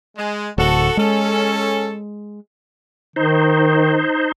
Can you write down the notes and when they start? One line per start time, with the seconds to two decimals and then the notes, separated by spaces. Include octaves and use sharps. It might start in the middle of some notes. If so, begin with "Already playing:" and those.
0.17 G#3
0.58 D1 F#4 A4
0.97 G#3 C#4 A4
3.16 D#3 D#4 C5